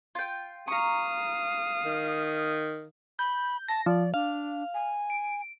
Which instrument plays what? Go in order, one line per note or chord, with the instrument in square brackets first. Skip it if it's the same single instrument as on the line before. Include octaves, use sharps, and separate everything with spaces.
[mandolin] F4 G5
[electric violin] F5 D#6 [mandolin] A#5 C#6
[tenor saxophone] D#3
[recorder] B5 [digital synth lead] G6
[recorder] A5 [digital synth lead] A#6
[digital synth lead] F3 [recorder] D5
[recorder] D4 [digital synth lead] F5
[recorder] G#5
[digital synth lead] D7